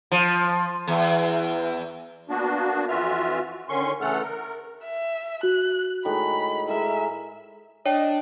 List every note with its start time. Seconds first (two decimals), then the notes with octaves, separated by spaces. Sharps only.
0.12 F3
0.88 E2
2.29 A#3 B3 D4 F#4
2.88 F2 E3 F4 F#4 E5 F6
3.69 D3 D#3 C#4 C6 C#6
4.01 C#3 E3 A3 A4 F#5 F6
4.22 A#4
4.84 E5
5.43 F#4 F#6
6.05 A2 D#3 G#3 B5
6.68 A2 G#3 A#4 E5
7.86 D4 C#5 D#5 G5